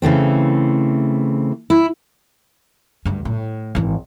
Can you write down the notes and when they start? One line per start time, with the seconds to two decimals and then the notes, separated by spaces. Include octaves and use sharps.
0.02 C#3 E3 A3 C4
1.70 E4
3.05 D2 G2
3.25 A2
3.75 G#1 E3